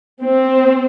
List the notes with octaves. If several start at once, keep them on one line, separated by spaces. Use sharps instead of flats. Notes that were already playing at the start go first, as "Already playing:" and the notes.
C4